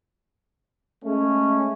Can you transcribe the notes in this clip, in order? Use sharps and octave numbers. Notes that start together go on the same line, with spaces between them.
G#3 A3 C#4